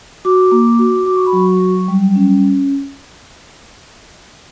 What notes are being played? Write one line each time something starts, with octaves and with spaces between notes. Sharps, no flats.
F#4 D6
A#3
F#4
F#4 D6
C#6
B5
F#3 C#6
F#3
G3
C#4